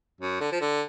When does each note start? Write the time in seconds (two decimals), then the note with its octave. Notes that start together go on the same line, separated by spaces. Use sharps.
0.21 F#2
0.40 D3
0.52 F3
0.61 D3